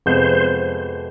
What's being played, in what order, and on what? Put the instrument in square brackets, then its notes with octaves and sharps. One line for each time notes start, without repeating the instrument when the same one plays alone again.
[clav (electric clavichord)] F2 C3 F3 G#3 B3 [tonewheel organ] C5